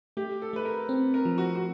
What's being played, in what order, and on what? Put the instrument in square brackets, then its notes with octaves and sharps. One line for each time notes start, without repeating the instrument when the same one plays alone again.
[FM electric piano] A3 [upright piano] G4
[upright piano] A4
[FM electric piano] A3 [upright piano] B4
[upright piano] A#4
[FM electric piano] C4
[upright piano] A#4
[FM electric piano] F3
[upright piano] F#4
F#4